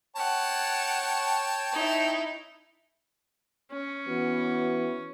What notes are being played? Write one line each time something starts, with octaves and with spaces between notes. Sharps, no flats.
C#5 F#5 G5 A5
D#4 E4
C#4
E3 B3 F#4